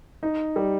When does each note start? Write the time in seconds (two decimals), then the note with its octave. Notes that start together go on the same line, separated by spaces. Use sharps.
0.23 D#4
0.56 G3